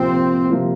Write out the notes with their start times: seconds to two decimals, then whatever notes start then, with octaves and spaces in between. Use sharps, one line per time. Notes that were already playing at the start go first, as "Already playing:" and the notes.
Already playing: C3 F3 A#3 C4 F4
0.50 C3 F3 A#3 F4